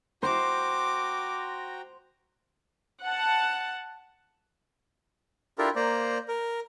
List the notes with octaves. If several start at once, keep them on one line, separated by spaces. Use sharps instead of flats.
F#4 C5 G5 A#5 D6
F#5 A5
D4 E4 F4 G4 A4 A#4
A#3 C5 D5 A#5
A#4